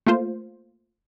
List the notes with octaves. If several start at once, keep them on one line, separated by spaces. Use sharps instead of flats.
A3 A#3 F4 C5